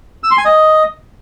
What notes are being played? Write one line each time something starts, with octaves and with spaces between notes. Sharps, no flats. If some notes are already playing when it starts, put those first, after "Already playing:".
E6
C6
G#5
D#5